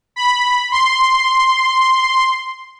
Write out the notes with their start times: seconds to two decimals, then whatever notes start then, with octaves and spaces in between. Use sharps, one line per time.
0.16 B5
0.72 C6